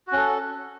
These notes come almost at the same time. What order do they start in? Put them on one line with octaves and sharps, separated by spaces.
F#4 C#4 A4